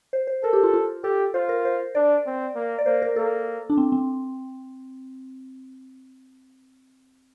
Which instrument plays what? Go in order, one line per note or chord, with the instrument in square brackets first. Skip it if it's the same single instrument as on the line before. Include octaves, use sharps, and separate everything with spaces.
[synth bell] C5
C5
[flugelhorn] A4 [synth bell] A#4
[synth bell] G4
F4
F4
[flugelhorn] G4 [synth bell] A4
[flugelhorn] F4 [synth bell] C5
[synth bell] A#4
C5
[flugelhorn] D4 [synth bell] D5
[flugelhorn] C4
A#3
[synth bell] D5
[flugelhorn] A#3 [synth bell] C5
[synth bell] A#4
[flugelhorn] A#3 [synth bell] A4
[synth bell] D4
C4
C4